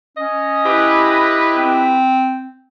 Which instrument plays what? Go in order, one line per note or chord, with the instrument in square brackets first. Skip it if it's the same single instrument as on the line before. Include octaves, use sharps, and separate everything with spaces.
[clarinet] C#4 [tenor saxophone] D#5
[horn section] E4 G4 B4
[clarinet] C4